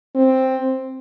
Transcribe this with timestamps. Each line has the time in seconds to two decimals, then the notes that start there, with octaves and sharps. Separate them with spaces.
0.16 C4